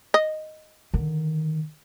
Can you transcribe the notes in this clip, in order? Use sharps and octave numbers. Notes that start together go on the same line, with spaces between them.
D#5
D3 D#3